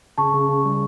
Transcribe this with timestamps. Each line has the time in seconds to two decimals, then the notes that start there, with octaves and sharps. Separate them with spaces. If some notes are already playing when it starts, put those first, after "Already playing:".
0.18 C#3 A5 C#6
0.34 C#3
0.49 C#3
0.65 G3